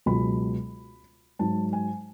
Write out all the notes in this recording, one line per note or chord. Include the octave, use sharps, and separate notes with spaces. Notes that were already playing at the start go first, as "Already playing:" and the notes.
C#2 B2 F#3 B5
G#2 F#3 A5
G#5